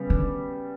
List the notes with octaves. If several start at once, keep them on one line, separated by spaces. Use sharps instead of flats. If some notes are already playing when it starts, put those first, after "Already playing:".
Already playing: C#3 G3 B3
D3